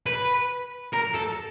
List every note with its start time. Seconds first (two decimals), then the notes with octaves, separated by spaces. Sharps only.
0.06 B4
0.93 A#4
1.14 A4